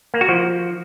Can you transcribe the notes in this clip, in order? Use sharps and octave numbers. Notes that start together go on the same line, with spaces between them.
A#3
F#4
F3